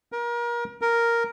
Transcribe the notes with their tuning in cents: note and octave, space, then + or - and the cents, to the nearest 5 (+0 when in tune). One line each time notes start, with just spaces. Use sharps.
A#4 +30
A#4 +0